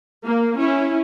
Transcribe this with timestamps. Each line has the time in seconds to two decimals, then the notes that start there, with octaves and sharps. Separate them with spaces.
0.25 A#3
0.58 C#4 E4